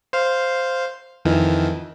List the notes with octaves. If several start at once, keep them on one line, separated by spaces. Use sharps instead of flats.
C5 F5
F2 D#3 E3